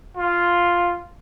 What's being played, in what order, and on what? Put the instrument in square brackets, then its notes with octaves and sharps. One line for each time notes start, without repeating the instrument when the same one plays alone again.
[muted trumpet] F4